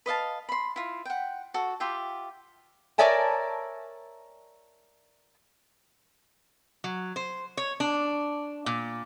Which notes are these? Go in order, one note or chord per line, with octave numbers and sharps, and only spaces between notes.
B4 D#5 F5 A5
B5 C6
E4 F4
F#5 G5
F#4 A4
F4 G4 E5 G5
A#4 C#5 D5 E5 G#5 A5
F#3
C5
C#5
D4
A#2